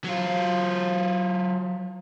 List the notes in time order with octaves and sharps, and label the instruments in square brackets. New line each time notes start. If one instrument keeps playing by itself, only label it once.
[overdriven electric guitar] F#3 F4